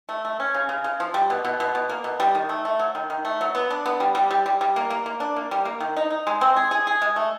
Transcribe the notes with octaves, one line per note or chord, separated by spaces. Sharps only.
A3
A3
C#4
C#3
C#3
C#3
F3
G3
B2
B2
B2
B2
A#3
B2
G3
D#3
A3
A3
F#3
D#3
D#3
A3
F#3
B3
D4
B3
G3
G3
G3
G3
G3
A#3
A#3
A#3
D4
A#3
G3
A#3
D#3
D#4
D#4
G#3
C4
G#4
G#4
G#4
G#3
A3